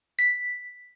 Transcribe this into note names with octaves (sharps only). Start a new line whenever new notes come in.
B6